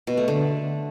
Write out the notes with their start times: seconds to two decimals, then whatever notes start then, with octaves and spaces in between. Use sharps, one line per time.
0.07 B2
0.17 A3
0.28 D3